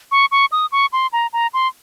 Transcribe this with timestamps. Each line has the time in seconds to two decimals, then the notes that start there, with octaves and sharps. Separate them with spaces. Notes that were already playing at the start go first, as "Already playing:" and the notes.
0.12 C#6
0.32 C#6
0.52 D#6
0.72 C#6
0.93 C6
1.13 A#5
1.33 A#5
1.54 C6